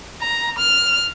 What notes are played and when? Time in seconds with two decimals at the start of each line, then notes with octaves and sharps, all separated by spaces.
0.22 A#5
0.59 F6